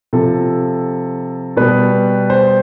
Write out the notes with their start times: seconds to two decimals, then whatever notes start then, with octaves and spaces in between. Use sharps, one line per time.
0.13 C3 F3 A4
1.57 B2 G3 B4
2.30 C5